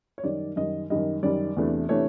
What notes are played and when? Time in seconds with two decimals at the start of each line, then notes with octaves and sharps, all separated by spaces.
0.18 C#5
0.23 F#2 D#3 G3 D5
0.56 F#2 D#3 G3 D#5
0.90 F#2 D#3 G3 D#5
1.23 F#2 D#3 G3 D5
1.57 E2 C3 E3 A3 D4
1.89 C3 E3 A3 D4 C#5